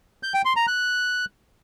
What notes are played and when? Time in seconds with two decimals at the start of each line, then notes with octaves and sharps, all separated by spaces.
0.23 G6
0.34 G5
0.45 C6
0.56 A#5
0.67 F#6